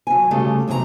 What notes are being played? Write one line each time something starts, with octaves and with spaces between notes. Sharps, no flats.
F#3 G#5
D2 C#3 G3 A3
E2 C3 F#3 G4 A#5